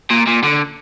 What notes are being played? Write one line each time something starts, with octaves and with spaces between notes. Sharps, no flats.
A#2
A#2
D3